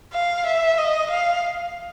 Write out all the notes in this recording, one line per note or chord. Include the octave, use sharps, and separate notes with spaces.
F5
E5
D#5
F5